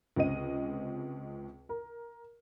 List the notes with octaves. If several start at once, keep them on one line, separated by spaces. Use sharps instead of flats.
C#2 C3 C4 D#5 D#7
A#4